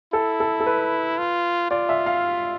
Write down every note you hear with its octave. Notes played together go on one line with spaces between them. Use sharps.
E4 A4
A4
A4
B4
F4
F4 D5
E5
F5